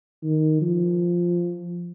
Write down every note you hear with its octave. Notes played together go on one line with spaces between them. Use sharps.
D#3
F3